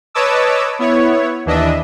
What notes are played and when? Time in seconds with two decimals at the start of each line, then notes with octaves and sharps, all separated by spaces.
0.14 B4 C#5 D#5 A5 D6 E6
0.79 B3 E4 C#5
1.46 D#2 E3 D4 D#5 E5